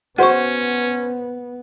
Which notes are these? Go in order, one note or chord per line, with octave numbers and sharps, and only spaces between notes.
B3 C#4 F#4 C5 F#5 C#6